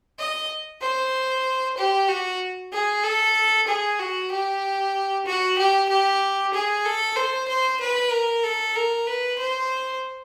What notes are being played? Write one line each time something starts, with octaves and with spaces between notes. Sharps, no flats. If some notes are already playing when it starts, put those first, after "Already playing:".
D#5
C5
G4
F#4
G#4
A4
G#4
F#4
G4
F#4
G4
G4
G#4
A4
C5
C5
B4
A#4
A4
A#4
B4
C5